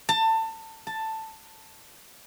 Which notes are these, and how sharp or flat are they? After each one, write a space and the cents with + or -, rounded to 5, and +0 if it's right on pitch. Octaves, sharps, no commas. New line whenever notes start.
A5 +25
A5 +10